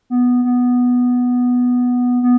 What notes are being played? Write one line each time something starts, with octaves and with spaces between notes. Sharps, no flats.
B3
B3
B3